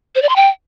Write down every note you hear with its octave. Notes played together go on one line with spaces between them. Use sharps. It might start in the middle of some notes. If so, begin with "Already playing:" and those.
C5
D5
C6
G5